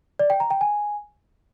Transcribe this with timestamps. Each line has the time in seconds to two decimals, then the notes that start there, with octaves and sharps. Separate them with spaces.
0.19 D5
0.30 G5
0.40 A#5
0.51 G5
0.61 G#5